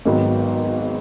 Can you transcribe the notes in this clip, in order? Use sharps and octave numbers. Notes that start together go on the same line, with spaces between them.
G#1 G#2 D#3 F#3 B3